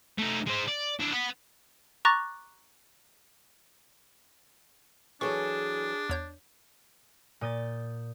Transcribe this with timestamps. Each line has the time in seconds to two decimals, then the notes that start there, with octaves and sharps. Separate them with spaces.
0.18 A3 D#4
0.47 G#3 C5
0.68 D5
1.00 D4 E4
1.13 B4 F#5
2.05 A#5 C#6 D6 F#6 A6 A#6
5.21 E3 F#3 D4 G#4 A4 C#6
6.10 E2 C#5 G6
7.41 A#2 D#6 G6 A6